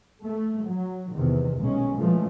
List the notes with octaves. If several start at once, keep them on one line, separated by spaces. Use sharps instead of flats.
A3
F#3
E2 C3 D#3
B1 A#2 G#3 C#4
A#2 C#3 E3 F3 G#3 A3